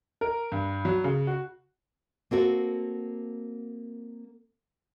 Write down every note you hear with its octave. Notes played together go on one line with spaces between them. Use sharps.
A#4
G2
F#3
C#3
F#4
A#3 C4 F#4 A4